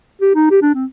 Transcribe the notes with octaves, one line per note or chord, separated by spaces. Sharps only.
G4
D#4
G4
D4
C4